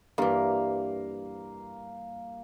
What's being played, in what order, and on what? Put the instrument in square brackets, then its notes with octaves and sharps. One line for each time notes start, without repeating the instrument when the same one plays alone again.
[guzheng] G2 E3 [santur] A#3